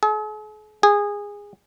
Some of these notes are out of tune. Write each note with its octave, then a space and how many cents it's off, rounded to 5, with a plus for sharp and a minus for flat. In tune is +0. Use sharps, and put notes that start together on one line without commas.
G#4 +45
G#4 -20